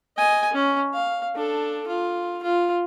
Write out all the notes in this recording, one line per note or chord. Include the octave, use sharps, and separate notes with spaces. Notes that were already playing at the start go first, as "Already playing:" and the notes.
D#5 G#5
C#4
F5
D4 A4
F4
F4